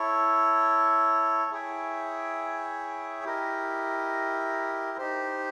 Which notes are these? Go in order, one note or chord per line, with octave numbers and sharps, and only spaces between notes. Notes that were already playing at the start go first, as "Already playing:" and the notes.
Already playing: E4 A4 C#5
E4 G#4 C#5 E5 G5
E4 G4 A#4 D#5
D#4 G4 C5